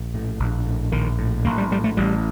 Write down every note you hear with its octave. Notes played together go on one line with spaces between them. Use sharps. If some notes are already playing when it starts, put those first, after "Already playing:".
Already playing: A#1
A2
A#1
A2
A#1 D#3
A2
A#1 A#3
G3
A2 G3
A3
A1 G3